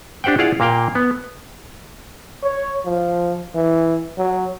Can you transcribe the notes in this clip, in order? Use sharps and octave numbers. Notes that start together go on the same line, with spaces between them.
D4 G4 C5 F#5 G5
E4 F4 G#4 D5 F5 F#5
A#2 A#3 F5 G5
B3
C#5
F3
E3
F#3